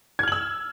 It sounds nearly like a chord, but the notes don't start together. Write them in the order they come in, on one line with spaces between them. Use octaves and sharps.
G#6 F6 F#7 E6